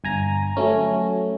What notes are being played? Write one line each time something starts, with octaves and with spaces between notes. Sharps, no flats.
G1 G#5 A#5
F#3 A3 C#4